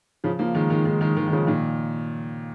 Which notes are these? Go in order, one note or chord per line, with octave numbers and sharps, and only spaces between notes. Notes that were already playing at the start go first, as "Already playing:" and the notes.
C#3 F3
F3 A#3
D#3 G#3
D#3 G#3
D#3 G#3
D#3 G#3
D#3 G#3
D#3
C#3 F3
A#2 D#3